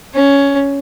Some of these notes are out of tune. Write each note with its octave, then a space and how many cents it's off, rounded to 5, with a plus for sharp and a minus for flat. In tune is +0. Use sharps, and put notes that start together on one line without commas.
C#4 +10